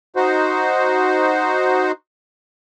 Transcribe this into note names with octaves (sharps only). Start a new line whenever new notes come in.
D#4 F#4 C5